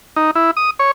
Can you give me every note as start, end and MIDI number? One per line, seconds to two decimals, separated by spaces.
0.16 0.31 63
0.35 0.51 64
0.57 0.70 87
0.79 0.91 73